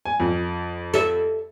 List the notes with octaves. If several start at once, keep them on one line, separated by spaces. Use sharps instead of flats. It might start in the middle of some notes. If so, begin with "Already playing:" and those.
G#5
F2
A4 E5